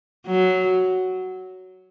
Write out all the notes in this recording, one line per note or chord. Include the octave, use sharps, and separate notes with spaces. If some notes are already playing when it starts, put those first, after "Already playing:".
F#3